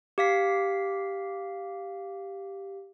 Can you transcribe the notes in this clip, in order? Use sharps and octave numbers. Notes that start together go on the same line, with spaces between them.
G4 F5 B6